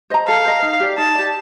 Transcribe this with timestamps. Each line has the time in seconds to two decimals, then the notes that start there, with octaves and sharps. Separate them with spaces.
0.10 C5 D#5 A#5
0.27 A4 F5
0.45 C5 D#5 A#5
0.62 D#4
0.80 G4 D5
0.98 D#4 A5
1.15 G4 D5